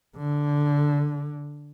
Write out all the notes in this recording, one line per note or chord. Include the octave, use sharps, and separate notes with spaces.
D3